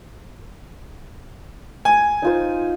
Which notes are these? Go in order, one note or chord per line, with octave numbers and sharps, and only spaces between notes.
G#5
D#4 F4 C5